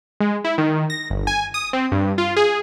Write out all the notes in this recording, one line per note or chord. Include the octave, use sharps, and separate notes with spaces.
G#3
E4
D#3
A#6
G1
G#5
D#6
C4
G2
F4
G#4